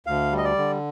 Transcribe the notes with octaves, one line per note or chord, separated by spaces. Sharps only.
D2 F5
G3
D#5
D5
D3